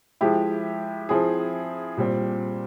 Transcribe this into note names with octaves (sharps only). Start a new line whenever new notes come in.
F3 G#3 E4 G4
F3 C4 E4 G#4
A#2 G3 C4